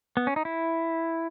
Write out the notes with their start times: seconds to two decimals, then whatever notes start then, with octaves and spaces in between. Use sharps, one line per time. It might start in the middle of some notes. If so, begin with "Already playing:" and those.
0.17 B3
0.27 C#4
0.36 D#4
0.45 E4